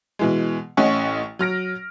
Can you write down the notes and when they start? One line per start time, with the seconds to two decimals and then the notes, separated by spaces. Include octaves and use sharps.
0.19 B2 E3 G#3
0.77 A1 A2 C#4 D#5 F#5 C#6
1.39 F#3 F6 A#6 D7